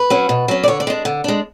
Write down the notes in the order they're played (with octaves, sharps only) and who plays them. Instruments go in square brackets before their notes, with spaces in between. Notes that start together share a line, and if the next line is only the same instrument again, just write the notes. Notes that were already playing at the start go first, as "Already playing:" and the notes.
Already playing: [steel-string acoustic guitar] B4
F#3 C#4
B2
F#3 C#4
D5
D3 C#5
D5
G#3 D4
D3
G#3 D4